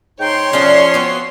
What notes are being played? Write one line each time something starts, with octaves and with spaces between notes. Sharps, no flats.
G#2 D#4 C#5 G5 C6
F3 C#4 D4 G#4 E5
B3 C4 F#4